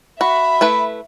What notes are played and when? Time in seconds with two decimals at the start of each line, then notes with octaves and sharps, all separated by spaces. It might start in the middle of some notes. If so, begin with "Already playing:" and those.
0.21 F#4 E5 B5
0.61 A3 E4 B4